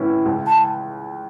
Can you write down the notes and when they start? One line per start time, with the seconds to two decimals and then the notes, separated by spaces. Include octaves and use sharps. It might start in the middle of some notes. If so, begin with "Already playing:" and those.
Already playing: A2 E3 C#4 E4
0.25 C#2
0.47 A5